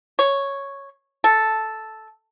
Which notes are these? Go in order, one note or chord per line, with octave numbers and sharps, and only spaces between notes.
C#5
A4